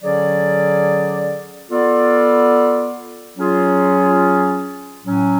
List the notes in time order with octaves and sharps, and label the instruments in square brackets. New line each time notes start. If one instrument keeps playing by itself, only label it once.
[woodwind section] D3 F#3 C#4 G#4 D5
B3 F4 A4 D5
F#3 C#4 F4 G#4
A2 F#3 C#4